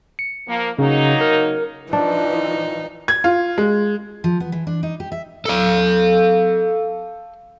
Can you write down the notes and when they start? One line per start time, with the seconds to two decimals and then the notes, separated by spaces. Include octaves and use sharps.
0.19 C#7
0.47 F3 A#3
0.79 C#3 F#3 A#3 D#4
1.21 A#4
1.93 E3 F3 D4 D#4
3.08 G#6
3.24 F4
3.58 G#3
4.24 F3
4.40 B3
4.52 E3
4.67 D4
4.83 D#4
5.00 G4
5.12 E5
5.45 A4 F5